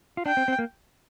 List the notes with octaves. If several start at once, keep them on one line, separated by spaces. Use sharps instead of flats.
F4
D4 G5
C4
C4
A#3